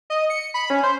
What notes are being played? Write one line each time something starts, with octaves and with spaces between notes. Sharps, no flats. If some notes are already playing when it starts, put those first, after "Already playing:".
D#5
C#7
B5
C#4
C5